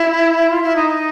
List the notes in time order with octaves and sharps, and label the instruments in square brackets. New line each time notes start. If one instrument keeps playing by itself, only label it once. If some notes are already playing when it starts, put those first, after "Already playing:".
Already playing: [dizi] E4
F4
E4
D#4